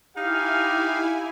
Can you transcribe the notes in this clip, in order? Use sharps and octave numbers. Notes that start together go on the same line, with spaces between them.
D#4 E4 G4 F5 G#5